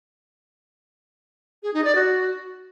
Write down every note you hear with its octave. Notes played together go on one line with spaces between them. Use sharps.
G#4
D#4
D5
F#4